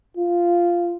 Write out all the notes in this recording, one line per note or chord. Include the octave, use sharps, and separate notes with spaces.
F4